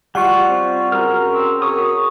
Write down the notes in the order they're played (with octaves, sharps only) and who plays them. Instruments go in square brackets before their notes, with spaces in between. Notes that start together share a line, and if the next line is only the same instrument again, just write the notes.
[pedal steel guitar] G3 F4 [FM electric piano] F#5 C#6
[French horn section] C4 C5
[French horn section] C#3 F#4 A#4 [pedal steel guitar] A#5 F6
[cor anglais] C4
[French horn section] F#4 G#4 A#4 [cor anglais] C#5 [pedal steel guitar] D#6